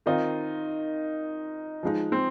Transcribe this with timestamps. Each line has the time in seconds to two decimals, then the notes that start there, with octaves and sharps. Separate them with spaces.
0.06 D#3 C4 D#4 F4
1.83 F3 G#3 D#4
2.12 C4